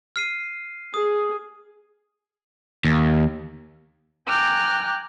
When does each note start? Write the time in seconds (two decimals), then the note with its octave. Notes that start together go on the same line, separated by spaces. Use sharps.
0.16 F6 C7 D#7
0.94 G#4 D#6
2.85 D#2
4.27 G5 G#5 A#5 D6 F6 F#6